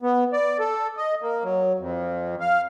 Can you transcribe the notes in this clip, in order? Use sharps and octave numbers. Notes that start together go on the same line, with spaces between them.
B3
D5
A4
D#5
A#3
F#3
F2
F5